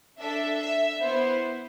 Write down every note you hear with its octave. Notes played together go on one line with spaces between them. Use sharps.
D4 A4 E5
E5
B3 E4 C5